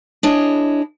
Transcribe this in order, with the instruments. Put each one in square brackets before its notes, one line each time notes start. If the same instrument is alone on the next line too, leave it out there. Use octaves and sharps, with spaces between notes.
[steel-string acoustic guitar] D4 E4 G#4 C#5 D#5